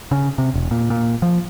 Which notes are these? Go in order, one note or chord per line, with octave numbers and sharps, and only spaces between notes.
C#3
C3
E1
A#2
A#2
F3